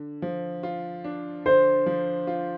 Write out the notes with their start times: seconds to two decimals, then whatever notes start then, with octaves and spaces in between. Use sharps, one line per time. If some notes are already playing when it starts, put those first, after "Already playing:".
Already playing: D3
0.22 F3
0.63 F4
1.04 D4
1.46 D3 C5
1.86 F3
2.27 F4